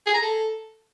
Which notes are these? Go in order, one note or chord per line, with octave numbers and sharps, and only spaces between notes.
G#4
A#5
A4